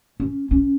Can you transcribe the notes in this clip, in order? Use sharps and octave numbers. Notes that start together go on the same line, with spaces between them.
C#4
C#4